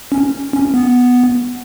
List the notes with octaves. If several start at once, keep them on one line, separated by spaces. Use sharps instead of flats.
C#4
C#4
B3